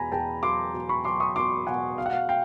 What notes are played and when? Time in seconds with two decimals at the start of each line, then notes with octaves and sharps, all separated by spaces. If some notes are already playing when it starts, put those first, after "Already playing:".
Already playing: E2 B2 G#5 A#5 B5
0.12 E2 G5 A5
0.43 F#3 C6 D6
0.74 B2
0.89 B5 C#6
1.05 F#3 C6 D6
1.20 C#6 D#6
1.36 B2 C6 D6
1.67 B2 F#5 G#5
1.98 B2 F5
2.06 F#5
2.13 F5
2.29 F5 G5